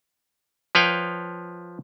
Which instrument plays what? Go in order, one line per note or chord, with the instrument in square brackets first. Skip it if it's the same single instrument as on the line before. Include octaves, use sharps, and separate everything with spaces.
[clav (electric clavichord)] F3 B4 C#5 F5 G5